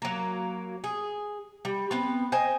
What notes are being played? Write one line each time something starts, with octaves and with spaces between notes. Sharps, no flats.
F#3 A#3
G#4
G3
B3 C4 B4
C5 D#5 G5 G#5